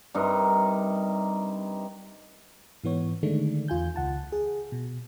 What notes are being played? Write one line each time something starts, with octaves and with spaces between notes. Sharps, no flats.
G2 C3 D#4 A#4
G#2 E3 B3 C#5
D3 D#3 G#3 A3 D4
E2 F4 G#5 G6
C#2 F#5 A5
G#4
B2